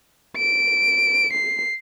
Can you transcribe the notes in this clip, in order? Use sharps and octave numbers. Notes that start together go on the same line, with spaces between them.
D7
C7